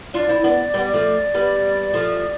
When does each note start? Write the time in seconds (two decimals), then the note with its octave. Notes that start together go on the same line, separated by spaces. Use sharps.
0.14 D4 F4 D5
0.29 C4 E4
0.44 B3 D4
0.74 G3 B3
0.94 F3 A3
1.34 G3 B3
1.94 F3 A3